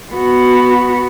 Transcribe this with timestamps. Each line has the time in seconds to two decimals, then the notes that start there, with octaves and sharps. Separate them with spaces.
0.13 B3 F#4